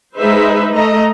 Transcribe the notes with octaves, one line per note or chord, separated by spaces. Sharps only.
G#3 D#4 B4 C5 E5
A3 D#5 A#5